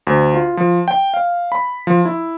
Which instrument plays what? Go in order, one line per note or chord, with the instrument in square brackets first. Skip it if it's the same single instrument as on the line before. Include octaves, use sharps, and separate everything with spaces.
[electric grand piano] D2
F4
F3
G5
F5
B5
F3
E4